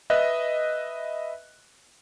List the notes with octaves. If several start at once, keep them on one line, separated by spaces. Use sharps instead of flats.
B4 D#5 E5 F#6